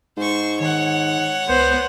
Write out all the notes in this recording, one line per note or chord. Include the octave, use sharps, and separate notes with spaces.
G#2 C5 C#6
D#3 C#5 F#5
C#2 B3 C5